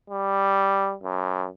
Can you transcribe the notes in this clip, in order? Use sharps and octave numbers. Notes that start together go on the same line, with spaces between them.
G3
F#2